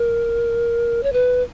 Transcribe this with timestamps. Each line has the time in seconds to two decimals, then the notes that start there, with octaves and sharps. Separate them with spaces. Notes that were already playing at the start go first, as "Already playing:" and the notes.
Already playing: A#4
1.03 C#5
1.13 B4